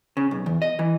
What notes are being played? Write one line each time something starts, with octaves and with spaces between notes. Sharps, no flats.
C#3
B1
E2
D#5
E3